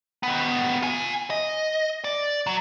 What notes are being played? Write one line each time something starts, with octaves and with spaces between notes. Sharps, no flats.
D#3 B3
F4 G#5
D#5
D5
F#3